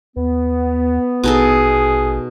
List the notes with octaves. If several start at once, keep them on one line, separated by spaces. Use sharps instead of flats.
D#2 B3
A#1 B2 D#4 G#4 A4